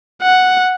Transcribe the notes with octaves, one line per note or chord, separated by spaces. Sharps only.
F#5